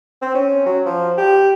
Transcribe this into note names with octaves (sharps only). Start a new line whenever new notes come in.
C4
C#4
F#3
F3
G4